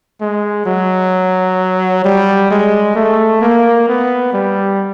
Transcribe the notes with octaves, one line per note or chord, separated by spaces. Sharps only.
G#3
F#3
G3
G#3
A3
A#3
B3
G3